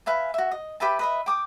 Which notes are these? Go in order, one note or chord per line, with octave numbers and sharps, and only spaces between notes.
B4 E5 F5 G#5
F#4 E5
D#5
G4 B4 E5 A5
B4 D#5 E5
G5 D6 D#6